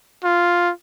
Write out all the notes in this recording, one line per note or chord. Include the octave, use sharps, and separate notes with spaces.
F4